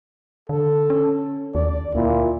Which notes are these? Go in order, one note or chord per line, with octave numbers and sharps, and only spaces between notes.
D3 A4
C#4
D#2 D5
D2 A#2 E4